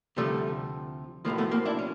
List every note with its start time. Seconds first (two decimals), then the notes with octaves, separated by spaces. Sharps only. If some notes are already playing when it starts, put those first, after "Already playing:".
0.17 D2 C3 F3 G3 A3
1.25 B1 A2 F3 G#3 A#3
1.38 A3 B3
1.51 A#3 C4
1.65 D4 E4
1.79 C#4